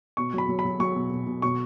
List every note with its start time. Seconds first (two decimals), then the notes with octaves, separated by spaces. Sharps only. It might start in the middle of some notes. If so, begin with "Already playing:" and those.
0.17 B2 C#6
0.34 F#3 B5
0.49 F#3
0.59 B5
0.65 F#3
0.80 F#3 C#6
0.95 B2
1.12 B2
1.27 B2
1.42 B2 C#6